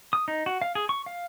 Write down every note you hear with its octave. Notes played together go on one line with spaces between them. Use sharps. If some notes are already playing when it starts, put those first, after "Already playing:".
D#6
D#4
F#4
F5
G#4
C#6
F5